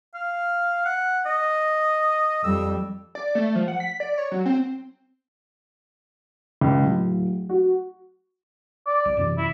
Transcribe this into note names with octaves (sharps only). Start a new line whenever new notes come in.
F5
F#5
D#5
F2 G3 E6
D5
A3
F3
F#5
B6
D5
C#5
F#3
C4
C#2
D1
F#4
D5
C2
F#2 C3 E3
E4